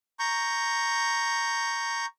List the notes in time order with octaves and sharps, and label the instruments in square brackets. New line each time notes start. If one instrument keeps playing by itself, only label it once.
[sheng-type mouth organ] A#5 C#6 G6